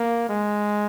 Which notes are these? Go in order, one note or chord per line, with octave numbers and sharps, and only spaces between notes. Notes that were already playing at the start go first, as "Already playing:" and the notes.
Already playing: A#3
G#3